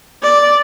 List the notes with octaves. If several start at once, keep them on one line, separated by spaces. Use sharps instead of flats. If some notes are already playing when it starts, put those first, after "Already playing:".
D5